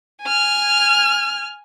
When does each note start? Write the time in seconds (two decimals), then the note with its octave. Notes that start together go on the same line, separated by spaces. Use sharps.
0.22 G#5 F6